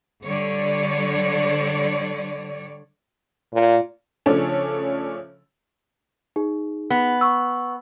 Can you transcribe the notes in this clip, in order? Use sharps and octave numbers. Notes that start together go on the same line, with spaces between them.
D3 G3 C#5 D5
A#2
C#3 F3 A3 C#4 D4 A4
D#4 G#4
B3
C#6 E6